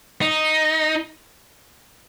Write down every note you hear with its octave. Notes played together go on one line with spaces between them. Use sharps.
D#4